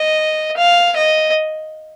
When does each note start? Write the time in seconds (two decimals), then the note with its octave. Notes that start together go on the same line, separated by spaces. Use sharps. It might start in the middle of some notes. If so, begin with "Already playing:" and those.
Already playing: D#5
0.57 F5
0.96 D#5